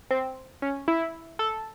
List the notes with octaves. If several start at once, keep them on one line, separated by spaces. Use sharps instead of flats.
C4
C#4
E4
A4